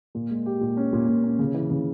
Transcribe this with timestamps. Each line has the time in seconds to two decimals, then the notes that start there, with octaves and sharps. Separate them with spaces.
0.15 A#2
0.31 G#3
0.46 G4
0.61 A#2
0.77 C#4
0.93 A#2
1.08 A#2
1.24 C#4
1.39 C#3
1.54 E3
1.71 C#3